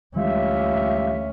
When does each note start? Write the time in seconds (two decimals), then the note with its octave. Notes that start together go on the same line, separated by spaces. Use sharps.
0.16 D2 E3 G3 G#3 C#4 F4 G4 E5